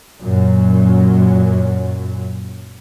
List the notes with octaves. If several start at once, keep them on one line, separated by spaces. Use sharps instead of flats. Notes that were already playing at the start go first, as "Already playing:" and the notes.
F#2 A#2 F#3